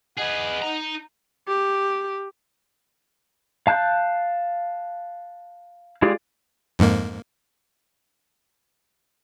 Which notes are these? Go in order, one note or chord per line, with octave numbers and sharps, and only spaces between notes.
G#4 B4 D#5 F#5
D#4 A#5
G4
F5 A5 F#6 G6
G#3 F4 G4 G#4 D5
F2 G#2 A#3